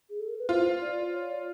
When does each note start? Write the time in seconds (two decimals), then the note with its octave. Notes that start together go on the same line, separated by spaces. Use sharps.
0.10 G#4
0.20 A4
0.29 A#4
0.39 B4
0.49 F4 C5
0.81 D5
1.13 C#5
1.31 D5